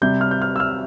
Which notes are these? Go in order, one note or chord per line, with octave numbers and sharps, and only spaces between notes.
C3 G3 G6
F6
G6
F6
E6
F6